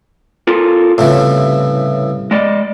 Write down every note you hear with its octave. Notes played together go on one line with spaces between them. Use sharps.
F4 A4 A#4
C2 F#2 A2 C#3 E3
G#3 D5 D#5